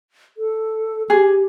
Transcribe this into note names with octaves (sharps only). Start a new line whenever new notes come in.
A4
G4 G#4